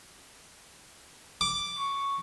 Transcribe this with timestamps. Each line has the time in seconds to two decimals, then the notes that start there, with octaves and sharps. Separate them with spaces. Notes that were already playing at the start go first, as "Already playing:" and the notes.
1.41 D6
1.79 C#6